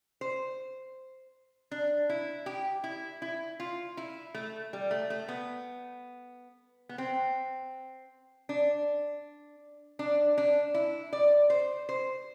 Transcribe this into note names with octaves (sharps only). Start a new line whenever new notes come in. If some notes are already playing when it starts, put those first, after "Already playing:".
C5
D4
E4
G4
E4
E4
F4
E4
A3
G3
A3
A3
B3
B3
C4
D4
D4
D4
E4
D5
C5
C5